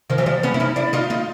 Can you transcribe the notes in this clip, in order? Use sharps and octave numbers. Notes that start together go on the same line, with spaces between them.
D#3 F3
E3 F#3
F3 G3
B3 C#4
E4
C#4 D#4
D4 E4
D#4 F4
D#4 F4